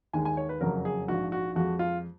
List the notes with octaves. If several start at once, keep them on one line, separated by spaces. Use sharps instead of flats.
D#2 D#3 G#3 G#5
G#5
C#5
B4
F#1 F2 C#3 F#3 A#4
G#4
A#1 G#2 F3 F#4
F#4
F2 F3 G#3 F#4
F4